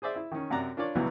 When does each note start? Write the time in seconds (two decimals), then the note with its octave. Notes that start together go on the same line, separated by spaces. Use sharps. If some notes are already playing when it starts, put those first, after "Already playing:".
0.02 G#4 C5 D5 E5
0.15 E4 E5
0.32 D#3 C#4
0.50 F#2 C3 D5 A#5 F#6
0.77 D4 F4 A#4 C#5 D5
0.95 C#2 B2 E3 F#3 G3 B3